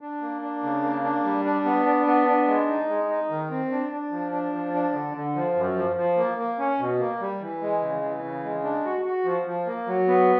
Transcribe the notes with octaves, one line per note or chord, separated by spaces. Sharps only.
D4
A#3
D4
C#3
A#3
D4
G3
D4
B3
D4
B3
D4
G#3
D#4
G#3
D#4
D#3
C4
D4
D4
F3
D4
F3
D4
D3
D3
F3
F#2
F3
F3
A#3
A#3
C#4
B2
A#3
G3
E3
G#3
C#3
E3
C#3
G#3
D4
F#4
F#4
F3
F3
A#3
F#3
B3